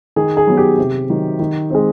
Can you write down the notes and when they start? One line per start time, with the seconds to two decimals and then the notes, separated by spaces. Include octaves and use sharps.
0.16 D#3 G#4
0.37 G#4
0.47 F#3 B3
0.57 G4
0.78 C3
1.09 D#3 F#3
1.40 D#3
1.70 G#3 C4